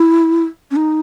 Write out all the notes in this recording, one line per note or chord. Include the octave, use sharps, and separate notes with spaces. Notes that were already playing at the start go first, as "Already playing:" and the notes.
Already playing: E4
C#4
D#4